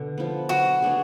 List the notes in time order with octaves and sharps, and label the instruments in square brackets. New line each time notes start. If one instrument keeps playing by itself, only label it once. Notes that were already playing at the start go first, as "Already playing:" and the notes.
Already playing: [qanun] B2 D3
F3 B3
[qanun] F#3 [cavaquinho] F#4
[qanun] B3 D4 G#4